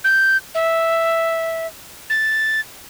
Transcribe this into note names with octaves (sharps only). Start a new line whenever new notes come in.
G6
E5
A6